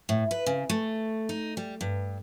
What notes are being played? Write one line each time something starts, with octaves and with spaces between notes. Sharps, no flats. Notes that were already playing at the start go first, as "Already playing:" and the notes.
A2
B4
C#3
A3
D#4
G3
G2